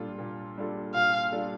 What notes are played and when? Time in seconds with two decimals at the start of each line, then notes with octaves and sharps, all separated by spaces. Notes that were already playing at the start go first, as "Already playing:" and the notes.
Already playing: A#2 G3 D4 F4 A4
0.18 A#2
0.57 G3 D4 F4 A4
0.94 A#2 F5
1.32 G3 D4 F4 A4